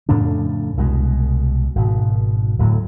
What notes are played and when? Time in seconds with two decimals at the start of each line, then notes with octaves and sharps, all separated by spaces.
0.09 F2 A2 C#3 D4
0.77 C2 B2 G#3
1.75 G#1 B2
2.59 D1 A2 F#3